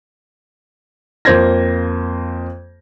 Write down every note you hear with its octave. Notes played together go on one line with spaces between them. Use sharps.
F2 A#3 C5 G6 G#6 A#6